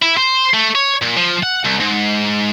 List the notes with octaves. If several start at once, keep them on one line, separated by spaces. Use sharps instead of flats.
E4
C5
A3
C#5
A#2
F3
F#5
C2
G#2